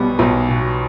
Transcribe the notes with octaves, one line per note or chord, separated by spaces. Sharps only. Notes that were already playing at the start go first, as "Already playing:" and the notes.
Already playing: B1 B2 G3 B3
B1
B2